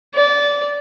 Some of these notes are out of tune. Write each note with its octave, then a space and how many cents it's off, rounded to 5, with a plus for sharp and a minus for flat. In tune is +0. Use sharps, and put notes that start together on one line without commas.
D5 -20